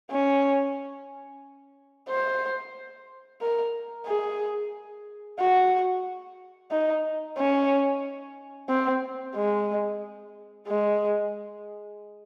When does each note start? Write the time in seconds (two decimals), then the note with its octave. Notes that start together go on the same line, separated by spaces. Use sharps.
0.11 C#4
2.09 C5
3.41 A#4
4.06 G#4
5.39 F#4
6.71 D#4
7.37 C#4
8.69 C4
9.35 G#3
10.67 G#3